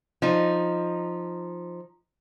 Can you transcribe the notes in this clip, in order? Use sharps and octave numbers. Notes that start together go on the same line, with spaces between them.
F3 D#4